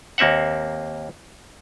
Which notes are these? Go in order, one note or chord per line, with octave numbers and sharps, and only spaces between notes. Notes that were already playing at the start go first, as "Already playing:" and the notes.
D#2 A#3 C4 E5 F#5